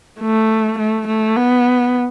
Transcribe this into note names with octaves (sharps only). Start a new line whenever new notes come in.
A3
A3
A3
B3